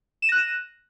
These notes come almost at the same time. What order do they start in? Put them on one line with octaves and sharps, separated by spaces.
E7 D#7 A#6 F#6